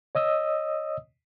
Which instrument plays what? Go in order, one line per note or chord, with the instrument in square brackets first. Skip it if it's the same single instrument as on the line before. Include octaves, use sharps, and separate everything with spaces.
[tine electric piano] C#5 D#5 D#6 E6